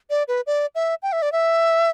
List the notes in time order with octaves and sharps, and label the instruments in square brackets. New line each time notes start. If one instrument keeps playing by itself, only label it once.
[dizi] D5
B4
D5
E5
G5
E5
D5
E5